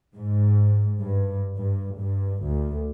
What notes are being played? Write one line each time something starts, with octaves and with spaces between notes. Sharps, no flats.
G#2
G2
G2
G2
D2